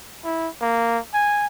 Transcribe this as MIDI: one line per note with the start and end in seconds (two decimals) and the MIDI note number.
0.24 0.48 64
0.61 0.99 58
1.14 1.47 80